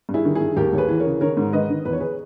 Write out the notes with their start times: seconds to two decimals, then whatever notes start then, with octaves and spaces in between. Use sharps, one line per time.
0.09 G2
0.14 E4 G#4
0.25 D#3
0.35 G2 E4 G#4
0.57 D#2 G4 A#4
0.73 D#2 C#5
0.78 G#4 B4
0.88 E3
1.00 A#4 C#5
1.06 C#3
1.21 D#3 A#4 C#5
1.37 G#2
1.53 D#3 B4 D#5
1.70 D#3
1.85 E2 B4
1.93 C#5
2.00 G#4 B4